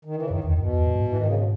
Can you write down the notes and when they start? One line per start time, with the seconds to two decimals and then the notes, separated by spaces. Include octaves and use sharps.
0.05 D#3
0.16 E3
0.22 C#3
0.30 F#2 D#3
0.44 E2 D#3
0.58 F#2 B2
0.73 E2
0.87 G#2
0.95 F#2
1.01 G#2
1.08 E3
1.18 D#3
1.26 C#3
1.35 B2